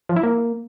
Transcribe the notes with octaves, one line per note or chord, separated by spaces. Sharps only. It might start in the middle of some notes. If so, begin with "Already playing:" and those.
F3
E4
A#3